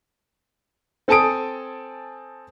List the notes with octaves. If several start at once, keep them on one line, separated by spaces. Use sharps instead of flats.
C4 A4 G#5 A5 D#6 D7